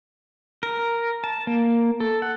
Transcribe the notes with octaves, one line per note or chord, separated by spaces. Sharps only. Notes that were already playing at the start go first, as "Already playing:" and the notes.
A#4
A5
A#3
A4
F#5